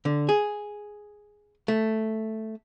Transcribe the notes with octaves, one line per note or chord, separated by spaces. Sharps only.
D3
G#4
A3